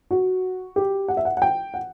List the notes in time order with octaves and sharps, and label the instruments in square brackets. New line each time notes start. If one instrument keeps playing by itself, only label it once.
[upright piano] F#4
G4
F#5
E5
F#5
F#5
G5
F#5